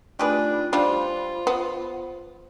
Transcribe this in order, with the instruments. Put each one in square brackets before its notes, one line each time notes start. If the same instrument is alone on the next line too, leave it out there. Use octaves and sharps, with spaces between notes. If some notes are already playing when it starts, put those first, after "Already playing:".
[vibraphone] A3 D#4 F4 [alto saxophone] D4 [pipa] G4 G#4 B4
[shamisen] G3 [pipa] D4 [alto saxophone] F4 [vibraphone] C5 B5
[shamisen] B3